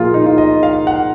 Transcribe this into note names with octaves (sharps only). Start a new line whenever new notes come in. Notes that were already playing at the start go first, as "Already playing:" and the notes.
Already playing: A#2 F3 A#3 F4 G#4 A#4
D#4
F4
D#5
F5
F#5